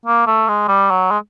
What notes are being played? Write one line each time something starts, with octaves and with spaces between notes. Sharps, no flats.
A#3
A3
G#3
G3
F#3
G#3